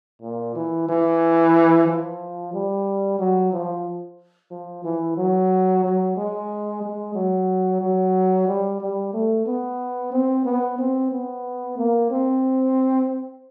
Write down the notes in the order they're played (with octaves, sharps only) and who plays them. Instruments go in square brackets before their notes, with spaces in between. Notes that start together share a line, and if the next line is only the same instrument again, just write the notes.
[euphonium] A#2
E3
E3
F3
G3
F#3
F3
F3
E3
F#3
F#3
G#3
G#3
F#3
F#3
G3
G3
A3
B3
C4
B3
C4
B3
A#3
C4